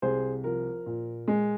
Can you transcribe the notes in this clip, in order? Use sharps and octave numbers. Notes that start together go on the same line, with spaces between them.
C2 G#4 C5
F3 A#4
A#2
G#3